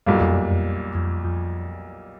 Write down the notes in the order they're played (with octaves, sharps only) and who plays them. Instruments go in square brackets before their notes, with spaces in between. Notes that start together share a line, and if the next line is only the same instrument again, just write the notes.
[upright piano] B1 A#2 G3 A#3 [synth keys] F#2
[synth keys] F2
F#2
F2
F2
F2